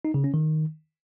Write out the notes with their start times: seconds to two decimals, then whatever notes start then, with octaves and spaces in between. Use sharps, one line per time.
0.05 D#4
0.14 C#3
0.24 C#4
0.34 D#3